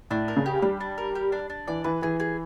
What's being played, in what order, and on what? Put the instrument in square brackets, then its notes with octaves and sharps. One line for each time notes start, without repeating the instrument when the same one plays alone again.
[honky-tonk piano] A2 [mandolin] D4
[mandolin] A#4
[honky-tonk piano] C#3
[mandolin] G4
[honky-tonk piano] G3 [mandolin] D4
[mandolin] D4
A#4
G4
D4
D4
[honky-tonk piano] E3 [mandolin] D5
[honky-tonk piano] E3 [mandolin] B4
[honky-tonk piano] E3 [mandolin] G#4
[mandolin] G#4